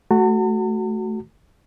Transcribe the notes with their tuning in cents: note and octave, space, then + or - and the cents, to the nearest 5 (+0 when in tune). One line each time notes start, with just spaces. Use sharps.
A3 -15 F#4 +10 A5 +45